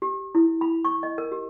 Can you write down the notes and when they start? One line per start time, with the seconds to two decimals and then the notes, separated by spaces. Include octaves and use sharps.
0.02 G4
0.35 E4
0.61 B5
0.85 C#6
1.03 D#5
1.18 A#4
1.32 G4